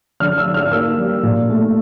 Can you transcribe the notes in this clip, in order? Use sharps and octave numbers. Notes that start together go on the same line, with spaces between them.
D3 F6
E6
D3
F6
A#3 E6
G3
A#2
A3